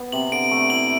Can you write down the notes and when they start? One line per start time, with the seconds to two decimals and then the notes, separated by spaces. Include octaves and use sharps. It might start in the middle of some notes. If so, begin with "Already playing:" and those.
Already playing: B3
0.12 C3 F#7
0.32 D3 D7
0.51 A3
0.70 E4 F#7